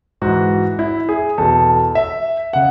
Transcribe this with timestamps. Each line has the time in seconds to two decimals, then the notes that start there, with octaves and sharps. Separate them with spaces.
0.22 G#2 E3 F#4
0.79 E4
1.09 G#4
1.38 E2 B2 A4
1.95 E5
2.53 C#3 F#5